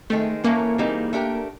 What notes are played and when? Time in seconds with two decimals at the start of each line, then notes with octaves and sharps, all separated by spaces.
0.10 D#3 G#3 A3 C4
0.44 A2 E3 A3 A#3 C#4
0.78 E3 G3 C4 D#4 G#4
1.13 A3 D4 G4 A#4